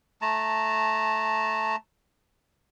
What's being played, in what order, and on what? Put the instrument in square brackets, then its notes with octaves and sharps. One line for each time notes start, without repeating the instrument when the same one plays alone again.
[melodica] A3 A5 A#5